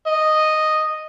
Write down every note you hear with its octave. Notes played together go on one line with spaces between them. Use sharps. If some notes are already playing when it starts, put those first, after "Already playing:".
D#5